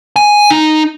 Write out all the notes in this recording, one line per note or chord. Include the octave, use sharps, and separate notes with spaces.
G#5
D#4